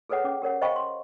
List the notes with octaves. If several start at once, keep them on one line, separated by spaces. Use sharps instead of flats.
G#4 A4 B4 C#5 F#5
C#4 D6
G4 A#4 C#5 F#5
C5 D#5 F5 G5 B5 C#6
C6